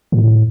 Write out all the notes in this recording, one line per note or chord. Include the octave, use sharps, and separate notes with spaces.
A2